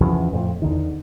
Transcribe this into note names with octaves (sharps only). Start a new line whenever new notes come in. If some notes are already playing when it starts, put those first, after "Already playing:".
E2 C#3 F3
F2 A2
E2 D3 D#3